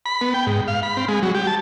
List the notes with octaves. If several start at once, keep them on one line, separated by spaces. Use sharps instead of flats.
B5
B3
G5
G#2
F5
B5
C4
G#3
F#3
G4
A5